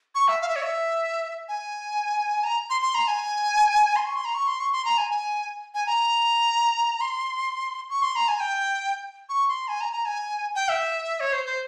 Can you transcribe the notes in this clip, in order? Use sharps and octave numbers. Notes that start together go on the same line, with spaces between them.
C#6
E5
F5
E5
C#5
E5
G#5
A#5
C6
C6
A#5
G#5
C6
C#6
C6
A#5
C#6
C6
C#6
C6
A#5
G#5
G#5
G#5
A#5
C6
C#6
C6
A#5
G#5
G5
C#6
C6
G#5
A#5
A#5
G#5
G5
E5
C#5
C5
C5